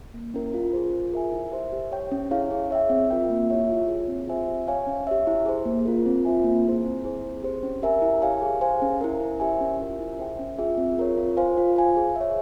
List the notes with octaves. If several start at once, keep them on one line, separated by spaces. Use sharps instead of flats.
A#3
C#4 E4 A#4
F4
G#4 C5
F4
A#4 E5 G#5
E4
G4 C5 E5
G4
C#5 G5
C#4
E4 G#4 C#5 F5
G#4
C#5 E5 G5
C4
F4 A#4 E5 G5
A#3
E4 G4 C#5 E5
F4
G#4 C#5
C4
F4 C5 E5 G#5
G4
C#5 F5 G#5
C#4
G4 C#5 E5
E4
G#4 C5
A#3
F4 A#4
C4
F4 C5 E5 G#5
A#3
E4 G#4 C5
C4
E4 G#4 C5
C4
G4 C5
C#4
G4 A#4 E5 G#5
E4
G4 C#5 F5 G#5
G#4
C5 F5 G#5
C#4
E4 A#4
E4
G4 C5 E5 G#5
C#4
F4 A#4 E5
E4
G#4 C5 E5 G5
C#4
F4 G#4 E5 G5
C4
F4 A#4 C#5
F4
C5 F5 G#5
F4
C5 F5 G#5
G#4
C#5 E5